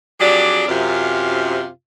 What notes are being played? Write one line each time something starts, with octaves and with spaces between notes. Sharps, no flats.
F2 F#3 D4 G4 G#4 D5
F#2 C3 F4